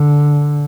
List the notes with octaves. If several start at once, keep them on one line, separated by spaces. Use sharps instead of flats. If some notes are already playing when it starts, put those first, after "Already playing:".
Already playing: D3